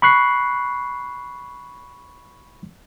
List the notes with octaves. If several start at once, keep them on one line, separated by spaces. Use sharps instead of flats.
B5 C#6 F#6 C7